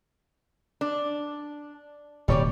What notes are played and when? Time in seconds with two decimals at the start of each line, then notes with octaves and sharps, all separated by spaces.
0.81 D4
2.28 D1 B2 G3 C#5 D5